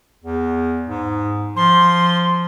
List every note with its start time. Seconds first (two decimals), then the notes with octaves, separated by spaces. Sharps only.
0.24 E2
0.87 G#2
1.56 F3 C6